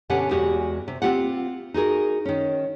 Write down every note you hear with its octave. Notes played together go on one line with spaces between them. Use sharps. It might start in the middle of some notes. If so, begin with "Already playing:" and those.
B2 D3 C#4 G4 F#5 G#5
E2 G#3 F#4 G4
C3
C4 D4 F4 G4 F#5
D#4 F#4 G#4 A#4
D#3 C#4